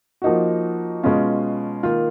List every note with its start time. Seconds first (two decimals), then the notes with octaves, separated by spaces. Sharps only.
0.22 F3 A#3 D#4 F#4
1.03 B2 G#3 C#4 F4
1.83 D#3 A#3 F4